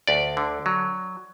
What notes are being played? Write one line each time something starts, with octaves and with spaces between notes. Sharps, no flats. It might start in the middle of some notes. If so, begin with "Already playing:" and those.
D2 D5
D3
F#3